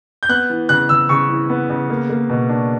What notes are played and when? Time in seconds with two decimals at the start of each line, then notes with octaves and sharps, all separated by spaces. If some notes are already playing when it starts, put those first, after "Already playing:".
0.23 G6
0.29 B3 F#6
0.50 E3
0.69 C#3 F#6
0.89 C#3 E6
1.09 C#3 C#6
1.29 E3
1.49 B3
1.70 C#3
1.90 A#3
2.10 A#3
2.29 B2
2.49 D4